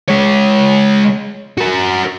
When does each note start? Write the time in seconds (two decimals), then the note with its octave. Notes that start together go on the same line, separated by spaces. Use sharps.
0.08 G#3 C#5
1.58 F#4 A#4